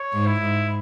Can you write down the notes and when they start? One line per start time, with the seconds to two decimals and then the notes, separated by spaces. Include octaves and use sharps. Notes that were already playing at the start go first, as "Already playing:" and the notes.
Already playing: C#5
0.13 G#2
0.26 E4
0.41 G#2